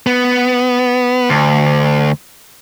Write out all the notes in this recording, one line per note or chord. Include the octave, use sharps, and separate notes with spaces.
B3
D2